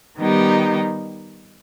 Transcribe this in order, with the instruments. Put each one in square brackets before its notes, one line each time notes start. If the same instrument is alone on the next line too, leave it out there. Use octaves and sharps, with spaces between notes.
[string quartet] D#3 G3 B3 D#4 G4